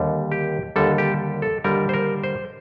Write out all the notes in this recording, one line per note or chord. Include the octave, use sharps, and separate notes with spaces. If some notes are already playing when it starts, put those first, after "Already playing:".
Already playing: D#2 D3 G3
G4
D#2 D3 G3 A4
G4
A4
D#2 D3 G3 A#4
C5
A#4
C5